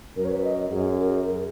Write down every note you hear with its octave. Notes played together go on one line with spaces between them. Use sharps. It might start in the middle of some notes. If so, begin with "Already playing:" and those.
F#2 A#4
C#5
B4
D#5
F#2 G#4
A#4
A#4
G#4